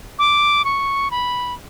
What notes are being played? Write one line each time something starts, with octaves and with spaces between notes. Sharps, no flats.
D6
C#6
B5